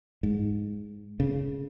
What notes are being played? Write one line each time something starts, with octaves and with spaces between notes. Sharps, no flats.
G#2
C#3